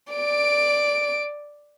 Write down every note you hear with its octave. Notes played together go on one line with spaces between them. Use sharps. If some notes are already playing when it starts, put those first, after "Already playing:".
D5 D7